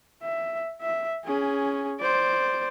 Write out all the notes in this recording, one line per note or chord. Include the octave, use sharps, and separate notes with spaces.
E5
E5
C#4 G#4
C5 D5